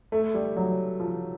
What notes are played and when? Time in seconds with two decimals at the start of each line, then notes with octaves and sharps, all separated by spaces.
0.12 A3
0.34 G3
0.57 F#3
1.00 F3